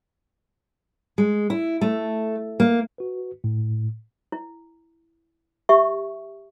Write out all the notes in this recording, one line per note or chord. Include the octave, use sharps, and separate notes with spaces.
G#3
E4
A3
A#3
F#4 B4
A2
E4
G4 E5 C#6